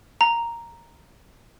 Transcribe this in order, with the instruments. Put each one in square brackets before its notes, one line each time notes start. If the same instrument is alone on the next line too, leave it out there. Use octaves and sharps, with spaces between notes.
[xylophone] A#5